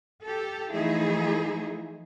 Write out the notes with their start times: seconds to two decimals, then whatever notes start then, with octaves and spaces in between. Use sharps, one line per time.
0.23 G4 A4
0.72 E3 F3 A3 D#4 E4 G#4